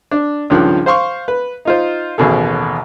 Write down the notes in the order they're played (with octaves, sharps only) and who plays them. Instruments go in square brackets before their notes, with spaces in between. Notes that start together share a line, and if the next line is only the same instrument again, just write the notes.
[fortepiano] D4
C#2 G2 D#3 F3 F#6
C5 F5 C6 C#6
B4
D#4 F4 C5
A1 D#2 B2 G#4 A4